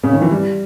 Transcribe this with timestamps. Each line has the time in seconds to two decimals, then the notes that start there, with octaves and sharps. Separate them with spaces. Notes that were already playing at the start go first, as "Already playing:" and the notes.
0.03 C#3
0.13 D#3
0.22 E3
0.31 G3